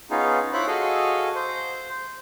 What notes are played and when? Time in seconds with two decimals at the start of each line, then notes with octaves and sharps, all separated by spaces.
0.11 B3 C#4 D#4 F4 G#4
0.53 E4 F4 C5 C#5 B5 F#6
0.67 F#4 G#4 A4 D#5 F5
1.35 C5